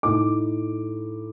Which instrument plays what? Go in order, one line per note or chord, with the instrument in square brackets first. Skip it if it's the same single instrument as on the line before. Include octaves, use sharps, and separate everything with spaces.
[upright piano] A2 A3 D#4 D6